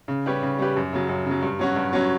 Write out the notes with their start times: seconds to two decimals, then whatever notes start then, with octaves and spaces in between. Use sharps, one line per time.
0.08 C#3
0.26 G3 C#4 G4 B4
0.43 C#3
0.59 G3 C#4 G4 B4
0.76 F#2
0.93 C#3 F#3
1.09 F#2
1.26 C#3 F#3
1.42 G2
1.59 F#3 C#4 F#4
1.76 G2
1.93 F#3 C#4 F#4